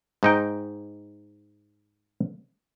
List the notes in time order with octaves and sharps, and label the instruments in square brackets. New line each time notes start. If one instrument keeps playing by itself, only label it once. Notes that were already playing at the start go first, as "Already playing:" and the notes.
[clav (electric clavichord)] G#2 D#4 G5